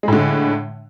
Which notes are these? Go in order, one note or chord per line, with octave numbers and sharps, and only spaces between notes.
A2 D3 G#3